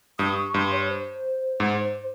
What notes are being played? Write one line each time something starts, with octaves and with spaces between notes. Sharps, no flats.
G2 D#6
C#6
G2 C6
C#5
C5
G#2 C5
C5